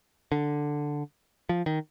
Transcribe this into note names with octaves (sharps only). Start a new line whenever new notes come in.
D3
F3
D#3